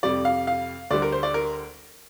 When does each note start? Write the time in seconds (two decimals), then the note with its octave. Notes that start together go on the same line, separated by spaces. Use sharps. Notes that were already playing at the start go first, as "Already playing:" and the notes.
0.03 F2 C3 G3 D5
0.25 F5
0.47 F5
0.90 D2 D3 G3 D5
1.02 A#4
1.12 C5
1.23 D5
1.34 A#4